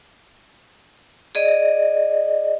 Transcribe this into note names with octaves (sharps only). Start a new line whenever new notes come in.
G#4 D5 D#5